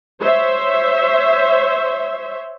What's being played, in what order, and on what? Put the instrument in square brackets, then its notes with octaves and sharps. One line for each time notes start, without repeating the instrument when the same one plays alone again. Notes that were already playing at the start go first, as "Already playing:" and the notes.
[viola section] C5 C#5 E5